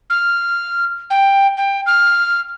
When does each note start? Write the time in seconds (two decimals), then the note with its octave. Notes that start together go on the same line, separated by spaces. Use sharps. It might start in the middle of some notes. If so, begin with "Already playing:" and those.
0.10 F6
1.10 G5
1.57 G5
1.86 F6